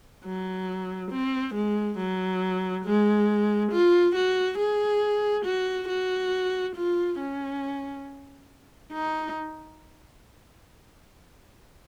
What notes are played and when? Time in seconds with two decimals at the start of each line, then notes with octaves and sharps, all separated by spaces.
0.24 F#3
1.11 C4
1.54 G#3
1.98 F#3
2.85 G#3
3.71 F4
4.15 F#4
4.58 G#4
5.45 F#4
5.88 F#4
6.76 F4
7.19 C#4
8.93 D#4